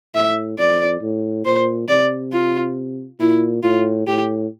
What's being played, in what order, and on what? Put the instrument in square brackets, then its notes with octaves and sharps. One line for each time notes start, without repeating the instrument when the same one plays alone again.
[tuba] A2 [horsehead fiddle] E5
[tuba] F2 [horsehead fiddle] D5
[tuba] A2
[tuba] A#2 [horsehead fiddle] C5
[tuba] C3 [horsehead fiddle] D5
[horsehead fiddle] F4
[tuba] A#2 [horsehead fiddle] E4
[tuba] A2 [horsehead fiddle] F4
[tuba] A2 [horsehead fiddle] G4